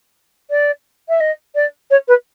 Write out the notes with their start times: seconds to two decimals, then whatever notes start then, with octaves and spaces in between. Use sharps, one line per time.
0.50 D5
1.09 E5
1.20 D#5
1.55 D5
1.91 C#5
2.08 B4